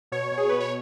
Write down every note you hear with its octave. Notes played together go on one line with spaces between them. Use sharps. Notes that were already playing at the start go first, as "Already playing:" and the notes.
B2 C#5
B2
G#4
B2 B4
C#5